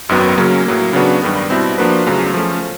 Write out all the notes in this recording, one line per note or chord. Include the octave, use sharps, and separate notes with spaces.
G#1 F#2 D#3 F#3 B3
C#3 F#3 A#3 C#4
A2 F#3 A#3
C#3 F#3 B3 D4 F#4
G2 D#3 G3 B3
B2 G3 C4 E4
F3 A#3 D4 F#4 B4
E2 C#3 F#3 A3
F3 A3 C#4